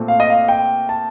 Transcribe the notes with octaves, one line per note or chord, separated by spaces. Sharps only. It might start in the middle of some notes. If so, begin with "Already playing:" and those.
Already playing: A#2 A3 C4
F5
D#5
F5
G5
A5